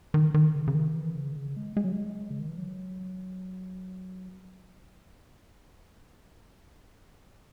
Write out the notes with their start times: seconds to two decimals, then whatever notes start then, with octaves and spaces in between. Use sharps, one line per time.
0.14 D#3
0.34 D#3
0.54 C#3
0.68 C#3
0.75 D#3
0.95 E3
1.15 C#3
1.32 D#3
1.36 C#3
1.57 G#3
1.77 G#3
1.84 F#3
1.92 G#3
2.30 C#3
2.40 D#3
2.49 E3
2.58 F#3